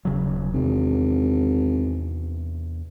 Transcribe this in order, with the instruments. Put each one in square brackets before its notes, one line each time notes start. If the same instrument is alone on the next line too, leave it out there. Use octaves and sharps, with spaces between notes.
[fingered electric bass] D#1 C#3 F#3
[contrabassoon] G#1 [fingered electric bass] E2 C3